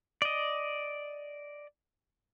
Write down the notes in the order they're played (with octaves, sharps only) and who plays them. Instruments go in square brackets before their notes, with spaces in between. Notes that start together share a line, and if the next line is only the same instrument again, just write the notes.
[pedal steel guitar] D5 D#5